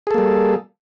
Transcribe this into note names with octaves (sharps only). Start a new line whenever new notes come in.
G3 A#3 G#4 A4